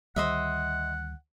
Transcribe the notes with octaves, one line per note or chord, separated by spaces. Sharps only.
D2 D#3 G3 C5 D#5 E5 F#5